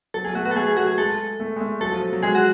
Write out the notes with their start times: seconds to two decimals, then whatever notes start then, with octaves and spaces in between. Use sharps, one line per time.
0.14 F#3 A4
0.25 F#3 G#4
0.35 A3 F#4
0.45 B3 F#4
0.51 A4
0.56 A3 G#4
0.67 G#4
0.77 F#3 F#4
0.87 G#4
0.98 G#3 A4
1.40 A3
1.56 G#3
1.60 A3
1.81 F#3 A4
1.92 F3
2.12 F#3
2.23 G#3 G#4
2.35 F#4